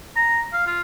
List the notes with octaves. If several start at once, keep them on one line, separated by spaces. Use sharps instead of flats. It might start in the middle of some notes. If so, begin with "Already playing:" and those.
A#5
F5
F4